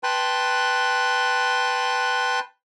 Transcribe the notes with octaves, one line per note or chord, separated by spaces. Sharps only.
B4 G5 A5 C6 F#6